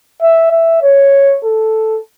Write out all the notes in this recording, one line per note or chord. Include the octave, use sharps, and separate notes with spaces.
E5
E5
C#5
A4